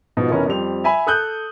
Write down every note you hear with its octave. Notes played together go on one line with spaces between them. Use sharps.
G#2 B2 F3
F1 E3 B3 C#4 A#4
F2 G3 C5 F7
E5 G#5 B5
A4 D#6 F#6 G6